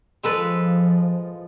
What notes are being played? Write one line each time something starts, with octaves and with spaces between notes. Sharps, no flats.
F3 G#3 A4 B4